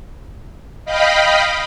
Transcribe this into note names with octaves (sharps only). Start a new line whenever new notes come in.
D#5 F5 G5 B5